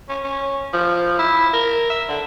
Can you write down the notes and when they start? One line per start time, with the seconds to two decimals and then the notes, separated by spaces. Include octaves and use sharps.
0.09 C#4
0.24 C#4
0.73 F3
1.19 E4
1.53 A#4
1.90 E5
2.09 D3